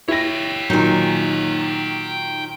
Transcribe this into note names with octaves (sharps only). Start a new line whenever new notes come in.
E4 G4 C#5 A#6
A#2 D#3 F#3 D#4 G#5